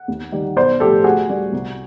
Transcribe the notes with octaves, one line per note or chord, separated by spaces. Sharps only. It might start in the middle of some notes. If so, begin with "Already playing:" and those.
Already playing: F#5
D#2
D#3 G3
B1 C5 D5
A2 F3 A3 G4 A4
D2 F#4 G#4
D3 G3
C2